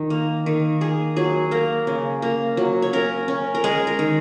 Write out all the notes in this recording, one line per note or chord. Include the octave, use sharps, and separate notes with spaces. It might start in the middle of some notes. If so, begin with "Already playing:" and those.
Already playing: D#3
A#3
D#3
A#3 G#4
F#3 G#4
A#3 A#4
C#3
A#3
F#3
C#5
C#4 A#4
C#4
A#4
G#3 G#4
A#4
D#3